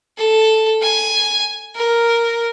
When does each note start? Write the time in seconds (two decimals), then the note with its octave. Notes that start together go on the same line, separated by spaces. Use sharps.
0.18 A4
0.82 G#5
1.76 A#4